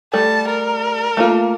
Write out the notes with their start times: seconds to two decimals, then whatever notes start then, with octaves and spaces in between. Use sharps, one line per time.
0.14 G3 A3 A5
0.49 A#4
1.17 A3 A#3 F4